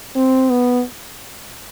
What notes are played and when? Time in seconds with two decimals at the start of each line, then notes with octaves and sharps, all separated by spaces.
0.15 C4
0.50 B3